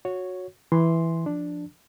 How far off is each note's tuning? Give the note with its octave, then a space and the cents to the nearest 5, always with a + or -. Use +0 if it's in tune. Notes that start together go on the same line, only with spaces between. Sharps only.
F#4 -20 C#5 +0
E3 +0 C6 +0
F3 +0 D4 +0